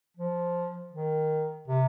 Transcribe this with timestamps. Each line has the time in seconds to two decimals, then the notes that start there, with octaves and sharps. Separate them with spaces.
0.17 F3
0.92 D#3
1.68 C3